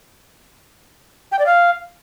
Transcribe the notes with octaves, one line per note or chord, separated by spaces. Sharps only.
G5
D5
F5